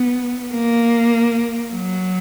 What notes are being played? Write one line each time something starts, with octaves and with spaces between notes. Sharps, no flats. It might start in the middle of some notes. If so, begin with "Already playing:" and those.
Already playing: B3
A#3
F#3